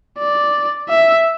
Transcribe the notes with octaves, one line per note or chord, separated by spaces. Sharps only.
D5
E5